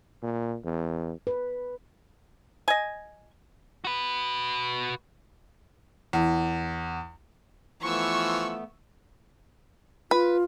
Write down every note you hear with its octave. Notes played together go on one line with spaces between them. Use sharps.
A#2
E2
B4
D#5 G#5
F#4 B4
E2
E3 F3 A3 B3 C#6 E6
F4 B4